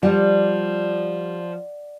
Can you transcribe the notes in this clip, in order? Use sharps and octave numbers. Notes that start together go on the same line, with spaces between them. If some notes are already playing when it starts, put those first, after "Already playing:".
F3 G3 D5 F#5